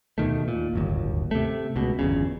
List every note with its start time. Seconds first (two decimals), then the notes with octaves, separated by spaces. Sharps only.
0.18 D#2 B2 D#3 A3
0.48 A#2
0.74 D1 G1 D#2
1.31 C3 A3
1.76 C#2 B2
1.99 G1 E2 C#3